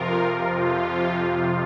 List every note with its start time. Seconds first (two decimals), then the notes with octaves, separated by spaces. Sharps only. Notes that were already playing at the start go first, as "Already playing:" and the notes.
Already playing: F2 C3 F3 F4 A#4
0.54 F2 C3 F3 F4